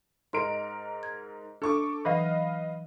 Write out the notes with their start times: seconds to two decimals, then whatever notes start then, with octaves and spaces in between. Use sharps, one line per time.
0.33 G#2 A#4 D#5 C6 D7
1.03 G#6
1.62 D4 A4 C#6 D6
2.05 E3 F#3 B4 D#5 F5